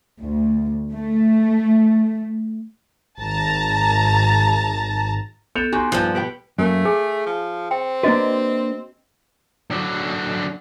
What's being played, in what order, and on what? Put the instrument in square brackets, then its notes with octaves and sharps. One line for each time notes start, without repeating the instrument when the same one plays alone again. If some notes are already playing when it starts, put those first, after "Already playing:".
[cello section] D2
A3
[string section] G#1 A5 A#5
[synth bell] B3 A4 [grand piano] G6 C#7 F7
[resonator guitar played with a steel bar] D#4 F#4 G4 [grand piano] G#5 C6
[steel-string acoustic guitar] G2 A#2 F3 [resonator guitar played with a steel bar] D#4 F4 [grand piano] F#6 G6
[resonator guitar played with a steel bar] B2 B3 G5 [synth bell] G4 B4
[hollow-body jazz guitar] F#2 A#3 [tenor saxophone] A3
[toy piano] G#4 [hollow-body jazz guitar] G#5
[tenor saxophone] F3
[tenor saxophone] C4 [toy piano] G5
[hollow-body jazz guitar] A#3 D4 B4 [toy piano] F#4 D#5
[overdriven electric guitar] D3 F#3